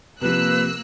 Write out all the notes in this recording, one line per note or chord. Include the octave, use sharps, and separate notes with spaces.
C3 F3 A#3 B4 E6 F#6